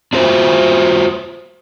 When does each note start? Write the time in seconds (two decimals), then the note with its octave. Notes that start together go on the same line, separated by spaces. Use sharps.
0.13 D4 F4 F#4 B4 C5 E5